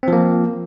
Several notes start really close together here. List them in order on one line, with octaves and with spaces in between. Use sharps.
C4 F3 A#3